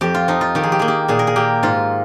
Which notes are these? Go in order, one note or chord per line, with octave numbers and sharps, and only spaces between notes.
F2 G4
F4
F3 D#4
F4
D#3 G4
G#4
G4
A#3 G#4
G4
A#2 G#4
A#4
G#4
A#3 G4
G#2 F4